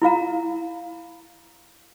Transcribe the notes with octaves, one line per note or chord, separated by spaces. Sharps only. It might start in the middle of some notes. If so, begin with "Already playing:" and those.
E4 F4 F5 A#5